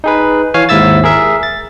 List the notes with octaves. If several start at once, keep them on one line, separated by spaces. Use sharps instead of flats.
D#4 G#4 B4
E3 C#5 F5 G#5
D#2 G#2 E4 E5 E6 A6
G#4 A#4 E5
A6